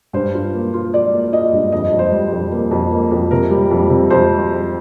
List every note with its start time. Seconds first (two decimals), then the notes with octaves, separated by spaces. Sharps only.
0.13 G2 C5
0.34 F4
0.54 A#3
0.74 F4
0.93 F4 D5
1.13 A#3
1.33 F4 D#5
1.53 G2
1.72 F2 D#5
1.92 F2
1.99 C5
2.12 G3
2.32 F2
2.51 A#3
2.71 F2
2.91 A#3
3.11 F2
3.31 C3 A#4
3.51 G3
3.71 F2
3.90 C3
4.10 F2 C5